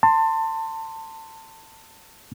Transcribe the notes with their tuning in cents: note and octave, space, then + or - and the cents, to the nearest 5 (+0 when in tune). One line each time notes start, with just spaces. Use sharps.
A5 +25 C6 +0